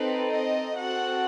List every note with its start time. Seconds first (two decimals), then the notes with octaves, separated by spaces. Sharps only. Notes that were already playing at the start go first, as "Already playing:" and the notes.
Already playing: C4 D#4 A4 B4
0.30 D#5
0.76 C4 F#4 A4 F#5